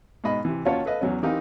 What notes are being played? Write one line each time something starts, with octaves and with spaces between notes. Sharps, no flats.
G#2 B2 D#5 B5
C3 E3
D#2 C#4 F4 F#4 C#5 A5
A4 B4 D#5 F5
E2 F#3 C#4
E3 C4 D#4 G4 A#4 F5